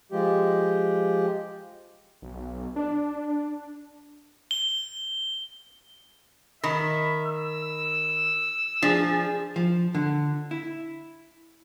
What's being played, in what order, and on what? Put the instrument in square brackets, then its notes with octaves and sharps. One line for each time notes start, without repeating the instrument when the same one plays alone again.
[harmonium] F3 G#3 G4
[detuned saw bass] B1
D4
[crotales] G7
[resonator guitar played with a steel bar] D#3 [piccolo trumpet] E5 [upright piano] B5
[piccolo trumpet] E6
[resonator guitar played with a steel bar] F3 [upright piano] D4 [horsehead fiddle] G#4
[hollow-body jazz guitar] F3
D3
E4